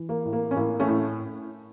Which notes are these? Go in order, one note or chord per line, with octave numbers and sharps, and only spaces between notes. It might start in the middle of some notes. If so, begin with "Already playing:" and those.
Already playing: E3
A#3
A2
A#3
C#4
A2 A#3
A3 C#4
A2